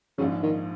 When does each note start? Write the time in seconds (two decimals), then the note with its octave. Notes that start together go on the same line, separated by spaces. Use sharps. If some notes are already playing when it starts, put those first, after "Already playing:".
0.18 A#1 G#2 C#3 F3
0.43 D#3